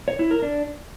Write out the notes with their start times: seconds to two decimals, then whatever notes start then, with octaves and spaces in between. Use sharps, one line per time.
0.08 C#5
0.19 E4
0.31 A#4
0.42 D4